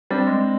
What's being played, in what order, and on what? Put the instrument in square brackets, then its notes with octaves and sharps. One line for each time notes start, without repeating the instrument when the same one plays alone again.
[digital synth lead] G3 [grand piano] C4 D4
[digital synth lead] G#3